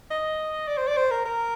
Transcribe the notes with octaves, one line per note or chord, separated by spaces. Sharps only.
D#5
D5
C5
D5
C5
A#4
A#4